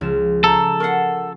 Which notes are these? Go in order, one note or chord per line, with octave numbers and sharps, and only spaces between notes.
C#2 F3 E7
G#3 A4 C5 G#5 A#5
A#4 F#5 C#6 C7